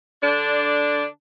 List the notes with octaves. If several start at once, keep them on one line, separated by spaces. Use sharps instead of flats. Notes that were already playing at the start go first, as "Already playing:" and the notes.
D3 D4